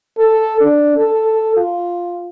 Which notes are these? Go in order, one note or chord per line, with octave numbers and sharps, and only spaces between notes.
A4
D4
A4
F4